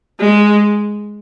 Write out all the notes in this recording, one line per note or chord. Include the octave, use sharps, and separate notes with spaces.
G#3